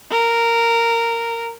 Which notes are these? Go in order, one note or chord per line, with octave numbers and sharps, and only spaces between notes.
A#4